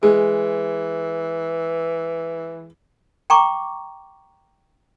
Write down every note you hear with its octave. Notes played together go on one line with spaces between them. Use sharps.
E3 G#3
G5 A#5 C#6 D6